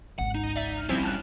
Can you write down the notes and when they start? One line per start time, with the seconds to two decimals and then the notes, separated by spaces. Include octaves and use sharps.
0.19 G#1 C#2 F#5
0.35 D#4
0.56 D5 E5
0.77 F6
0.89 F3 G3 C4 C#4 E4
1.03 A5 F6 F#6